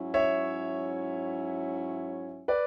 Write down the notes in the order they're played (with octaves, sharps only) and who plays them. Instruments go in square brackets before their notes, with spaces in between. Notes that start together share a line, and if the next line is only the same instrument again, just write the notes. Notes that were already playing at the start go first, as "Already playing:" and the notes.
Already playing: [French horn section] G#2 F#3 C#4 E4
[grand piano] C#5 E5
B4 D5